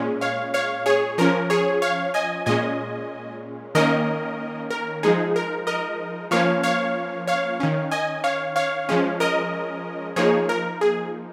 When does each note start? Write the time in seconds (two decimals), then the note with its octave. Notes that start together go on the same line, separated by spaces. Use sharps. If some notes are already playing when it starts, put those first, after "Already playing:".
Already playing: A#2 G#3 C#4
0.21 C#5 F5
0.54 C#5 F5
0.86 G#4 C#5
1.18 F3 C#4 A#4
1.50 G#4 C#5
1.82 C#5 F5
2.14 D#5 G#5
2.46 A#2 G#3 C#4 D#5 G#5
3.75 D#3 A#3 C#4 A#4 D#5
4.71 A#4
5.03 F3 G#3 D#4 G#4
5.36 A#4
5.67 A#4 D#5
6.31 F3 A#3 C#4 C#5 F5
6.63 C#5 F5
7.28 C#5 F5
7.60 D#3 C#4
7.91 D#5 G#5
8.24 C#5 F5
8.56 C#5 F5
8.89 F3 G#3 C#4
9.20 A#4 D#5
10.16 F3 A#3 D#4 G#4 C#5
10.49 A#4
10.81 G#4